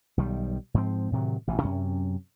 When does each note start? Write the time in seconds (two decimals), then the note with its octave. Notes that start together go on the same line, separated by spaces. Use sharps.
0.17 B1 D#3 G3
0.74 G#2 F3 C4
1.12 A2 C3 D#3 F#3
1.47 A1 B2 E3
1.62 F#2 C3 C#4